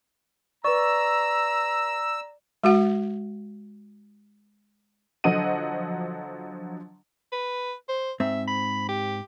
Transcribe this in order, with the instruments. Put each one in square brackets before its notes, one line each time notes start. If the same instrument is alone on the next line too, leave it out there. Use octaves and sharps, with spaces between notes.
[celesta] B4 C#6 [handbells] D5 [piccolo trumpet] A#5 [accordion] E6
[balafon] G#3 F#4 F#5
[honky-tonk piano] D3 F3 F#3 D#5 F#5 D#7
[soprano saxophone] B4
C5
[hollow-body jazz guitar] G#2 C4 [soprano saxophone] E5
[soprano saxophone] B5
G4